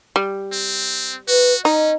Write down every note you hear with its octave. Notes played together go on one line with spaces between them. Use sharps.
G3
C4
F#4 B4
C#4 D#4 D#5